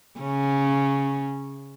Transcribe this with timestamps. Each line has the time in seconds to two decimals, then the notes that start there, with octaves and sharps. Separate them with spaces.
0.20 C#3 C#4